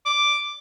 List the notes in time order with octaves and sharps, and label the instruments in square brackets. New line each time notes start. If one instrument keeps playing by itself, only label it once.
[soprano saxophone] D6